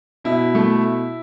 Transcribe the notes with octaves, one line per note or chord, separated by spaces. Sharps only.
B2 E4
A3